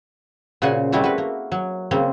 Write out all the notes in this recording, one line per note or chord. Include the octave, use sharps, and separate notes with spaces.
A#2 C#3 F#4 C5 F#5 G#5
G3 A3 C4 E4 F#4
F#4 B4
A#3
F#3
C#3 A#3 C4